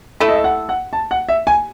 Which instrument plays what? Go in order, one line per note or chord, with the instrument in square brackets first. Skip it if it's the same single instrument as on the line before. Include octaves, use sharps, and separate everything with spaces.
[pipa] A3 E4 A4 [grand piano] E5
[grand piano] D#5
E5
F#5
F#5
A5
F#5
E5
G#5